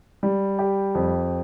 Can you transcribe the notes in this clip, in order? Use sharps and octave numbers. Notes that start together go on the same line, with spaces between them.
G3
G4
F2